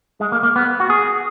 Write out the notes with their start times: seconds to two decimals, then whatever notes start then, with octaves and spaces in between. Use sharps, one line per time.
0.21 G#3
0.32 A#3
0.43 A#3
0.56 B3
0.80 F#4
0.90 G#4